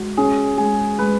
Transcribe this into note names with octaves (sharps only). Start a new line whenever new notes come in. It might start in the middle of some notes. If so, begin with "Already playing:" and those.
Already playing: G#3 F#4
C#4 G#4
G#3 G#4
G#3 B4